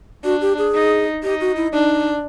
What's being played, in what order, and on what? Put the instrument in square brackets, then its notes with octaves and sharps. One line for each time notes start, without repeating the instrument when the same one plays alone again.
[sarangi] D4 [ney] F#4
[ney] G4
G#4
[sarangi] D#4
[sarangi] D#4 [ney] G4
[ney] F#4
E4
[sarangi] D4 [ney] D#4